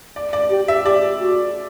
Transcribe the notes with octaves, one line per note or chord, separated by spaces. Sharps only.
D5
D5
G4
E5
G4 D5
F#4